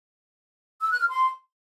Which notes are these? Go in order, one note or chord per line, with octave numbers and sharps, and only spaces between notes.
E6
F#6
F6
C6